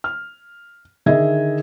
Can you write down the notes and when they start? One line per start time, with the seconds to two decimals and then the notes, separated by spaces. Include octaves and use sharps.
0.04 F6
1.06 D3 D#3 G#4 D#5 E5 G#6